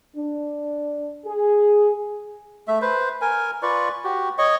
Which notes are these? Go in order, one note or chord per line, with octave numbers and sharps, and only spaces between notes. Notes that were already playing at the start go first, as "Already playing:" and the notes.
D4
G#4
A3 E5
B4 C5
A#4 G#5
F4 B4 D5 C#6
F#4 G4
C#5 D#5 C#6